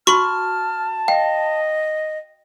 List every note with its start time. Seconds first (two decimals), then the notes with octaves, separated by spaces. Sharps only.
0.07 F#4 A5 B5 C#6 F6
1.08 D#5 F5 G5